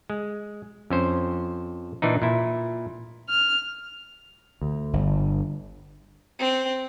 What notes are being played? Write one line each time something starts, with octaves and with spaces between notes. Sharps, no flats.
G#3
F2 C#4 C5
A#2 E3 D4 D#4
A#2 E4
F6
D2
G1
C4